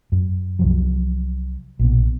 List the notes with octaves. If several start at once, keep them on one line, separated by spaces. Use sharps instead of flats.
F#2
C2 F3 F#3
A#1 B2